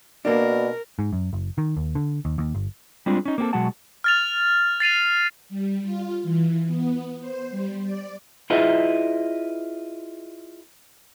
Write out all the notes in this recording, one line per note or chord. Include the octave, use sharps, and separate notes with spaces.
B2 A#3 D4 A#4
G#2
F#2
F#1
D#3
D#2
D3
D#2
D#2
G1
G3 G#3 C4 D4 F4
C#4 D#4
A#3 C4 F#4 A4
B2 F#3 G#3 F#4 F#5 A5
F6 A6 F7
A6 C7 D#7 F7
G3
F4
E3
B3
C5
G3
D5
E4 F4 G#4 B4 D#5 E5